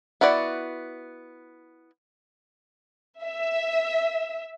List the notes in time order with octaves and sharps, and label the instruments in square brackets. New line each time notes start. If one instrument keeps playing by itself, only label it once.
[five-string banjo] B3 E4 F#4 D5
[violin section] E5